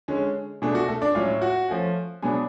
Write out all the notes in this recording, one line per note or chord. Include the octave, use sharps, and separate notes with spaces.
D3 G#3 C#4
B2 A3 D4 G#4
F#4
A3 A4
D4 D5
A2 F#3 C#4 F4 F5
F#4 F#5
F3 A3 C#4
B2 F#3 B3 D4 G#4 G#5